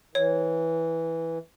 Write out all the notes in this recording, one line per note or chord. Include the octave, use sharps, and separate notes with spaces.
E3 C#5